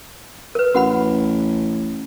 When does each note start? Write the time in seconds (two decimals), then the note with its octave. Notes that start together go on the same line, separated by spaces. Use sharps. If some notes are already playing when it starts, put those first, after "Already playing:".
0.55 A#4 B4
0.75 A1 F#4 F#5 B5